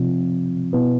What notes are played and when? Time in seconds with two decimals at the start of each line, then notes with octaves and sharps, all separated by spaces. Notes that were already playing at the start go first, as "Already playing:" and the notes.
Already playing: C3 F3 C4 F4
0.73 B2 B3 E4 B4